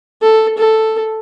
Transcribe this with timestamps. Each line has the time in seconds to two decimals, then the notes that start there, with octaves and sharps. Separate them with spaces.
0.21 A4
0.58 A4